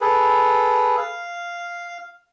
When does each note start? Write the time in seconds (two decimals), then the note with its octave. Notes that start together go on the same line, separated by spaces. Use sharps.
0.01 G#4 A4 B4
0.98 F5